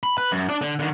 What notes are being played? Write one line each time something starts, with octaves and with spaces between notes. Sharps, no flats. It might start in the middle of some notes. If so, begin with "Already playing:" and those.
B5
B4
F#2
D4 D5
D3
D3 D#3